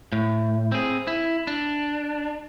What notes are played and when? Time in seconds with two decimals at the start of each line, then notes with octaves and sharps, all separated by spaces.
0.12 A2
0.72 C4 G#4
1.07 E4
1.47 D4